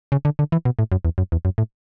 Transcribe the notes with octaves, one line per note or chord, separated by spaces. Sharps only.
C#3
D3
D3
E3
B2
A2
F#2
E2
F#2
E2
F#2
A2